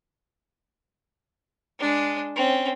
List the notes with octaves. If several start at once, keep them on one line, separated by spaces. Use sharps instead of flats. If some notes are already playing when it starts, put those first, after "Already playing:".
G#3 D4
C4 C#4